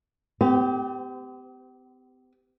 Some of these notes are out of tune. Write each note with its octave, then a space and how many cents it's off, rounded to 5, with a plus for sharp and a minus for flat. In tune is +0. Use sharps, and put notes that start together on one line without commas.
C4 -45 G4 +0